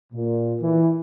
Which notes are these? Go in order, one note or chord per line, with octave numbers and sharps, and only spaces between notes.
A#2
E3